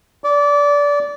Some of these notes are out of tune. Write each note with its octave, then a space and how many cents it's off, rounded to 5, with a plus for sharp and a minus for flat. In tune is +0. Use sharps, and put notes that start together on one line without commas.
D5 -20